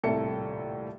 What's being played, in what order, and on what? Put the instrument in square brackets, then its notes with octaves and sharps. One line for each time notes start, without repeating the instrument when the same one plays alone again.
[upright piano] D#1 C2 A2 A4 E5 C#7